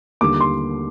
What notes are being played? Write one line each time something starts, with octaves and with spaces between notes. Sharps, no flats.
D#2 D3 G3 D6
C6